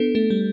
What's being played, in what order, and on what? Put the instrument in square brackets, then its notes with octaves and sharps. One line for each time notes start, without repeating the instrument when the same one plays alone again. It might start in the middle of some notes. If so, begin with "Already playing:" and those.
Already playing: [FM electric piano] B3 [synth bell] D4 A4
[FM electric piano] A3 [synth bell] A4
[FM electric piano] G3